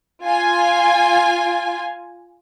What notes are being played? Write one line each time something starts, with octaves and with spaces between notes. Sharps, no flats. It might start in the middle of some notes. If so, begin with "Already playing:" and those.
F4 G#5